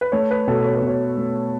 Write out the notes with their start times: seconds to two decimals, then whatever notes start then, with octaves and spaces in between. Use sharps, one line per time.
0.01 B4
0.12 A3 C#5
0.31 B4
0.48 B2 A4
0.65 C#5
0.76 B4
0.82 B2
0.87 C#5
1.17 A3